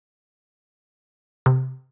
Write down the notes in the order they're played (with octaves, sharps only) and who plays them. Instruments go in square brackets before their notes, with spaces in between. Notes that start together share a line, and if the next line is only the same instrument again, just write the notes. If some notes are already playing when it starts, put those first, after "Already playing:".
[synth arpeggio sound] C3